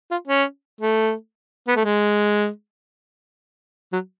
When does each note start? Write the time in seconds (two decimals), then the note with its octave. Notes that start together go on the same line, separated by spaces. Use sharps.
0.11 F4
0.28 C#4
0.81 A3
1.68 B3
1.76 A3
1.85 G#3
3.93 F#3